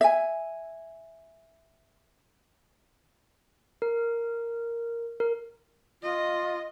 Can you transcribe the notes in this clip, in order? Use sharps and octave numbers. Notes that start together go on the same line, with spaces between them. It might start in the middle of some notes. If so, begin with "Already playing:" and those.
E5 G#5
A#4
A#4
F4 D#5